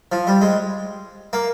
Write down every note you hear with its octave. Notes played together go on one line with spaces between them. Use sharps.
F3
G3
G#3
A#3